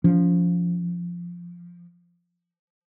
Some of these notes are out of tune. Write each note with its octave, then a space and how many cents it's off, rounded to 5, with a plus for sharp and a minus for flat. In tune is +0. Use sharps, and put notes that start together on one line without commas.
F3 +0 C#4 +40